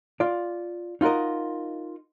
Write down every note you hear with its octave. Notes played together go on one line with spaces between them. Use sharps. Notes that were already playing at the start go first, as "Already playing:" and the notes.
F4 D5
D#4 F4 F#4 A#4 D#5